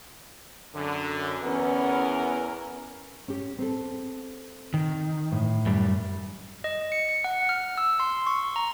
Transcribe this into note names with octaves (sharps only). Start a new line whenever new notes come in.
F#2 D3
E2 B3 C#4 A#4
C#4 G4
C4 G4 A4
D#3
A2
F#2 G3
D#5
C#7
C#7
F#5
F6
E6
C6
C#6
A#5